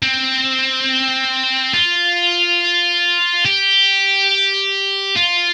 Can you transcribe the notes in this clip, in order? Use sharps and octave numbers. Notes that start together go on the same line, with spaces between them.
C4
F4
G4
F4